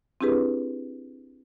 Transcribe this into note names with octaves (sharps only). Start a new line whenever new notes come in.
C4 D4 E4 G4 G#4 B4